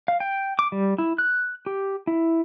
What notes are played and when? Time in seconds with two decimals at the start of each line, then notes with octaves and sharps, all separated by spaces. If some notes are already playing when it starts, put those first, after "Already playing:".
0.08 F5
0.20 G5
0.59 D6
0.72 G3
0.98 E4
1.18 F#6
1.66 G4
2.07 E4